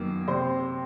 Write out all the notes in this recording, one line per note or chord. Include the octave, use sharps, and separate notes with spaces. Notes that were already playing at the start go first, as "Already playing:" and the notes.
Already playing: F#2 D#3 F#3 A#3 B3
C3 C5